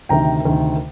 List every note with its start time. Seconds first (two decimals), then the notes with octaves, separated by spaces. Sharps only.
0.09 D2 C3 D#3 G5 A#5
0.45 D2 C3 D#3